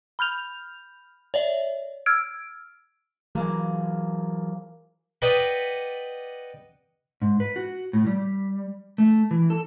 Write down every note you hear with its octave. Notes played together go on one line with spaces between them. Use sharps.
B5 F6 G6 F7
C#5 D5 E5
E6 F6 G#6 D7
E3 F#3 G#3 A#3
B4 D5 D#5 F#5 G5 B5
G#2
B4
F#4
A2
G3
A3
E3
A4